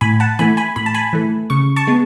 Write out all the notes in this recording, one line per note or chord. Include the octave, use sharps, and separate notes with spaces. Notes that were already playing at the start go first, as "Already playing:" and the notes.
A2 G#5 B5
F#5 A5
E3 A3 G#5 B5
G#5 B5
A2 B5
A5
G#5 B5
E3 A3
C#3 C#6
A5 C#6
G#3 B3